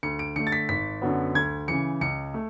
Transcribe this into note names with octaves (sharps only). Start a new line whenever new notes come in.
D2 C#7
D7
D3 A3 C#7
A6
B6
G#1 B6
F#2 D3 F#3 B3
D2 G#6
C#3 E3 C#7
C#2 C#7
A3